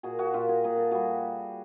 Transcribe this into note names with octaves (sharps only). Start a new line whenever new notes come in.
A#2 F#4 G#4
F#4 G#4
A#2 F4 G4
F#4 G#4
A#2 G#4
A4
G3 F#4 G#4